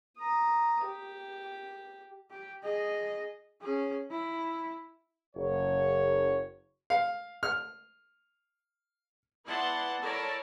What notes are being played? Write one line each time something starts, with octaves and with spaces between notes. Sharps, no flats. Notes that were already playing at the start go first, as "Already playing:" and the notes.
A#5 D#6
G4
G4
G#4 D#5
C#4 G#4
E4
F#1 C#5
F5
F6
B3 E4 D5 F#5 A5 C6
E4 A4 A#4 C#5 D5 A5